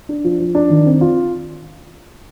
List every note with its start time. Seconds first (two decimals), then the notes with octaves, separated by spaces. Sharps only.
0.09 D4
0.24 F3
0.40 F3
0.55 D4
0.70 D#3
0.86 C4
1.01 F4